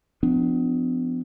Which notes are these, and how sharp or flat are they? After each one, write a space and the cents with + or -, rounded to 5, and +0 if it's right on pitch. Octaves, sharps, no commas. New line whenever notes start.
F3 +0 B3 +40 D4 +10